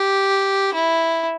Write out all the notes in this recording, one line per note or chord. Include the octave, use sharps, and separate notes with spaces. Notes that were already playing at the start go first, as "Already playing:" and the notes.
Already playing: G4
E4